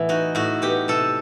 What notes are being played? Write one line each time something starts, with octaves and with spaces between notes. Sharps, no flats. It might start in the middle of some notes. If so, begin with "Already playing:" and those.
Already playing: A2 E3 B3
D#4 F#4
A2 F#4
B3 G4
C3 A4